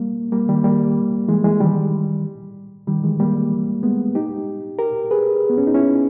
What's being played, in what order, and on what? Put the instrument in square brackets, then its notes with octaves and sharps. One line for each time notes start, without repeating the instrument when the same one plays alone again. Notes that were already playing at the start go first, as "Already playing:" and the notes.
Already playing: [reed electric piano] G3 A#3
G3 A#3
D#3 G3
G3 A#3
E3 G#3
E3 G#3
D#3 G3
D#3 G3
E3 G#3
G3 A#3
G#3 B3
D#4 G4
G4 A#4
G#4 B4
B3
C#4
D#4
C#4 E4